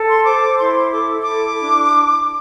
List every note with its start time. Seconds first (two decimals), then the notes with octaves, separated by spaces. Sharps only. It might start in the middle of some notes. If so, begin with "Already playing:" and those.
Already playing: A4
0.08 C6
0.24 C5 D6
0.59 E4 C6
0.92 A4 D6
1.21 D6
1.27 E4
1.60 D4